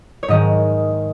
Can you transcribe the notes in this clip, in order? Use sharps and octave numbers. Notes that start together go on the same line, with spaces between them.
C#5
G#2 D#3 G#3 D#5